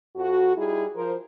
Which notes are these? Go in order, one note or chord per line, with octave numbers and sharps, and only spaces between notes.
F2 F#4
G3 D#4 E4 G#4
F3 A#4 C5